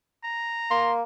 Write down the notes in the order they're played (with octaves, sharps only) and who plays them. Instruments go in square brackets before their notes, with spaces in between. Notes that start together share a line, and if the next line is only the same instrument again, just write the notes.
[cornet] A#5
[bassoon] A#3 [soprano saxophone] C6